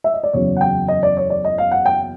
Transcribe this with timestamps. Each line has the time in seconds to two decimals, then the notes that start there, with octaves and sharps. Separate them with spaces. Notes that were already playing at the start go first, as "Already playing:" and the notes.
0.04 E5
0.14 D#5
0.23 D5
0.33 F#1 E2 C#3 F#3 C#5
0.56 F#5
0.61 G5
0.88 D#5
1.03 D5
1.17 C#5
1.30 D5
1.45 D#5
1.58 F5
1.71 F#5
1.86 G5